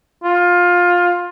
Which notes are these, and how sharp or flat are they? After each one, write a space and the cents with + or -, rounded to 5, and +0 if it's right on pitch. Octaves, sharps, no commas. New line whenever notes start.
F4 +15